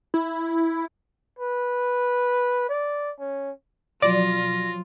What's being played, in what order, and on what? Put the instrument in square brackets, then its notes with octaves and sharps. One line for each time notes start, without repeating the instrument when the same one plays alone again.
[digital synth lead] E4
[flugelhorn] B4
D5
C#4
[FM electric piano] B2 F3 F#3 [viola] F4 [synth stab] D5 [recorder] A#6